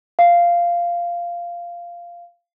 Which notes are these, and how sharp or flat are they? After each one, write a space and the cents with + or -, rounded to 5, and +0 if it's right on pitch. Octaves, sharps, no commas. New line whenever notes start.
F5 -10